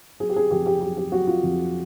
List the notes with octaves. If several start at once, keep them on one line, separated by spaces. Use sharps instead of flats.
F#3 G#4
G4
G#4
F2 G4
G4
F#3 G4
G4
F#3 F#4
F4
F2